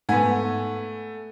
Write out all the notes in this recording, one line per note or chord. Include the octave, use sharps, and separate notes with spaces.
G#2 A3 B3 F#5 G#5 B6